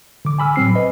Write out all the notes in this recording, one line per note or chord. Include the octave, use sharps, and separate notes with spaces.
D3 D6
G#5 B5 E6 F6
A2 F#3 C4 C7
B4 D#5